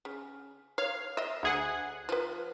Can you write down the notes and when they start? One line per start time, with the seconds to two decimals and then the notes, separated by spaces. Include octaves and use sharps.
0.05 C#3
0.78 C#5 F5
1.17 D#5 E5
1.43 D2 G#4 F#5
2.09 F3 B4